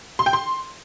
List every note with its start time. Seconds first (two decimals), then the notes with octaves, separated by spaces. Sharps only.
0.19 C6
0.26 G5
0.33 C6